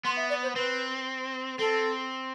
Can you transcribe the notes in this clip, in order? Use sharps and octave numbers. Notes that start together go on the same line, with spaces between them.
B3 C6
E5
D5
C5
C4 B4
C4 A4